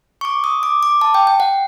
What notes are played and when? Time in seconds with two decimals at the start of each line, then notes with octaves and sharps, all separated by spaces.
0.21 C#6
0.25 D6
0.44 D#6
0.63 D6
0.83 D6
1.01 A5
1.15 G5
1.27 G5
1.40 F#5